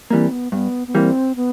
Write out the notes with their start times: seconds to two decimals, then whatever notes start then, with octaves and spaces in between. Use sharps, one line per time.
0.11 E3 G3 A#3 C4
0.32 B3
0.52 G2 B3
0.88 B3
0.95 E3 G3 A#3 C4
1.36 B3